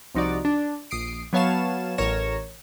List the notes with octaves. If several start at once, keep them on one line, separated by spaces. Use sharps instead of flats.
C2 F3 D#4 F#4 D5
D4
A#1 D#6 C7 D7
F#3 B3 C#5 F5 A5 E7
A1 A#4 C#5 A#6 E7